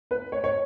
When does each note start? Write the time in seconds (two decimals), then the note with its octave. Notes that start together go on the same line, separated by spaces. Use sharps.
0.11 B4
0.32 C#5
0.44 C#5